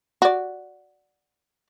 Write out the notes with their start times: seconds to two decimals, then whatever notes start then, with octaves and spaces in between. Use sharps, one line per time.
0.22 F#4 D5